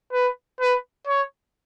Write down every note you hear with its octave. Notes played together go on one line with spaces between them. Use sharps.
B4
B4
C#5